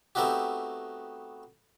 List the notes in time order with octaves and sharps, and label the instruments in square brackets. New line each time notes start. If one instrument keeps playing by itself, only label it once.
[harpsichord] A3 B3 C4 D#4 F#4 G4